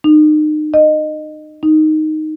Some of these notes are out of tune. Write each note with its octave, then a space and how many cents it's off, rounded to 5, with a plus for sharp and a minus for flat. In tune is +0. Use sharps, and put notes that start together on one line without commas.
D#4 -35
D#5 -20
D#4 -5